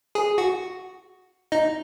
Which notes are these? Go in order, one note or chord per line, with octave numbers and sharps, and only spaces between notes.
G#4 G#5
F#4 F#5
D#4 D#5